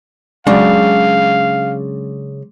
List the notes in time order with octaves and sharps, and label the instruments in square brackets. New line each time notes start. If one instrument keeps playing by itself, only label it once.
[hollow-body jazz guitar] C#3 D4 [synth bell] F#3 G#3 [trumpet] F5